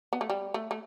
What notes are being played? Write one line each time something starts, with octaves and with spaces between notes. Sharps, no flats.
B3
A3
G3
A3
A3